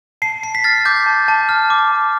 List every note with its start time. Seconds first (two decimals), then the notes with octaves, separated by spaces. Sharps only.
0.22 A5 C7
0.43 A5 C7
0.55 B6
0.64 F6 A6
0.85 D6 G6
1.06 A5
1.28 A5
1.49 F6
1.70 D6
1.91 A5